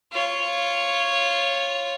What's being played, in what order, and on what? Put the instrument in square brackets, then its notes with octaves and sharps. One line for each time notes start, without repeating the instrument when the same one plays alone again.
[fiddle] F4 C#5